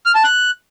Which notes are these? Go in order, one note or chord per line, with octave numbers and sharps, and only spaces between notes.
F6
A5
F#6